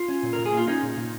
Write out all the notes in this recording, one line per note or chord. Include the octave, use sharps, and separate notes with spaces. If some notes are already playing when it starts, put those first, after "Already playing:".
Already playing: F4
C#4
A#2
A#4
A#2
G#4
A#3 F4
C#4 D#4
A#2
A#2